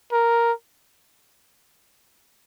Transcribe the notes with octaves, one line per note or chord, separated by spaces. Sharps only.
A#4